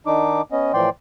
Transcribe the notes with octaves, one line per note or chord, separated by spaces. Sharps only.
D#3 D4 D#4 D6
B3 C#4 D#5
A2 E3 F3 D5 G5 C6